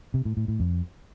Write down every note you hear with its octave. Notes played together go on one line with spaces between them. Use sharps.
C3
A2
A2
A2
F2